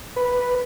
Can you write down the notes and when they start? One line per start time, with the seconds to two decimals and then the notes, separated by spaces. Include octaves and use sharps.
0.16 B4